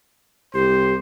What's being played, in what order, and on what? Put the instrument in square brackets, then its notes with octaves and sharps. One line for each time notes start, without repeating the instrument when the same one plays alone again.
[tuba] C2 [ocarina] G4 [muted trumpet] C5